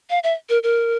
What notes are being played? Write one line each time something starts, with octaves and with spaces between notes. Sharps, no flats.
F5
E5
A#4
A#4